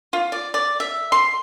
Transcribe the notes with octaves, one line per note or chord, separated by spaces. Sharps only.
F4
D5
D5
E5
C6